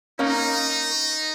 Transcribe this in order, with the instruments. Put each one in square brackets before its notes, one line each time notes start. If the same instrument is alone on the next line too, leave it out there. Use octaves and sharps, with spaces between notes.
[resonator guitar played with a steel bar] A#3 C#4 A#4 F5 [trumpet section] D#4